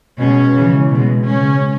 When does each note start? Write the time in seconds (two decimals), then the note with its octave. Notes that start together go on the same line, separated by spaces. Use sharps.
0.18 B2 G#3 C#4
0.54 C#3 E3 G#3
0.91 B2 G#3
1.27 C#3 G#3 C#4